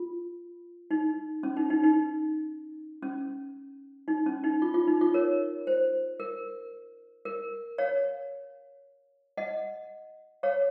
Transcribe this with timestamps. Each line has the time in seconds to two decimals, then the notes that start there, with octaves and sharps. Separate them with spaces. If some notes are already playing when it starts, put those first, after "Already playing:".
Already playing: F4
0.91 D#4
1.43 C#4
1.56 D#4
1.70 D#4
1.84 D#4
3.02 C#4
4.08 D#4
4.26 C#4
4.44 D#4
4.62 F4
4.74 F4
4.87 D#4
5.01 F4
5.14 A#4 C#5
5.67 C5
6.20 A#4
7.25 A#4
7.78 C#5 F5
9.37 D#5 F#5
10.43 C#5 F5